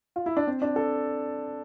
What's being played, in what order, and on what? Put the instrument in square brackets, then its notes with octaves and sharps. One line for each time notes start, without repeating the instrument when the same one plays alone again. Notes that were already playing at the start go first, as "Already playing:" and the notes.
[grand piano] F4
E4
D4
C4
D4
A4